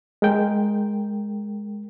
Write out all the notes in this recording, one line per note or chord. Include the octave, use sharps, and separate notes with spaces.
G#3 A#4 G5